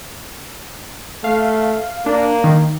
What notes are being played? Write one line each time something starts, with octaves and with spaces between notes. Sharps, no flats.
A3 F5
A#3 D4
D#3